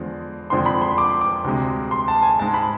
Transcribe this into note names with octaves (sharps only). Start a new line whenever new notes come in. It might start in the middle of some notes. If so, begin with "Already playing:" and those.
Already playing: E2 D3 F3 G#3
F2 D3 F3 G#3 C6
B5
C6
D6
D6
D2 C3 G#3
C6
A5
G#5
G#2 G#3 A5
B5